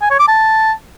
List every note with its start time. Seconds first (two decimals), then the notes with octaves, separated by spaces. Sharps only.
0.01 G#5
0.10 C#5
0.19 D6
0.28 A5